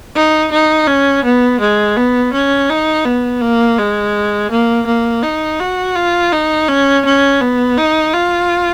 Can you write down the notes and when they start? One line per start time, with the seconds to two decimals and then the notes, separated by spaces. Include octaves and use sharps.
0.16 D#4
0.52 D#4
0.88 C#4
1.24 B3
1.60 G#3
1.97 B3
2.33 C#4
2.69 D#4
3.05 B3
3.41 A#3
3.78 G#3
4.51 A#3
4.86 A#3
5.23 D#4
5.60 F#4
5.96 F4
6.33 D#4
6.69 C#4
7.05 C#4
7.41 B3
7.77 D#4
8.14 F4